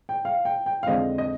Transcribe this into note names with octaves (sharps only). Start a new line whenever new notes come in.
G5
F5
G5
G5
F5
F2 D3 G#3 C4 D#5
D#5